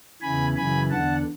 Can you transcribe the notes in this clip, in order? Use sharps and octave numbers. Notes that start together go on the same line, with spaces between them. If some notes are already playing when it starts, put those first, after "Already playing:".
E2 C#3 E3 G#5 B5
F#2 C#3 E3 G#5 B5
E2 D3 F#5 A5